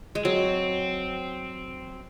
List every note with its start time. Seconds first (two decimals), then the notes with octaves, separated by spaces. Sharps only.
0.15 G#3
0.25 F#3 C4